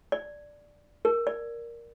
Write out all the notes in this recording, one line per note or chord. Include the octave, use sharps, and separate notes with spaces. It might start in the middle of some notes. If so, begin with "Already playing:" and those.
D5
A#4
D5